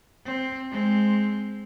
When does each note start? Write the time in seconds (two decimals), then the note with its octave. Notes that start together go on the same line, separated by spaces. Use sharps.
0.25 C4
0.71 G#3 C4